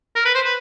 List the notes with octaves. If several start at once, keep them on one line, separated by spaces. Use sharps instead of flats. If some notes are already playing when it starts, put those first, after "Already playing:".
A#4
B4
C5
B4